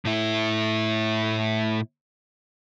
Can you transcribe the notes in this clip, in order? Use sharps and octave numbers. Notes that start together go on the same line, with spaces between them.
A2 E4